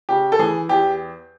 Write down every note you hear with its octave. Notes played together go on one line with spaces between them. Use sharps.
C#3 G4
A4
E3 G#4
E2 G4